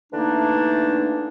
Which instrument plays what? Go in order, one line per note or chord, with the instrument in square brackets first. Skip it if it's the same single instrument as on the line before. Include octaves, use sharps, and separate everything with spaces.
[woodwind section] D3 E3 A3 A#3 D4 D#4